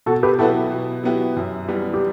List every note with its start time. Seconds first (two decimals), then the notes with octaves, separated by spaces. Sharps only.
0.06 B2 F#4 A4
0.23 G4 B4
0.39 F#3 B3 E4 F#4 G4 A4
0.72 B2
1.04 F#3 B3 E4 G4
1.36 F#2
1.68 E3 G3 B3
1.94 G4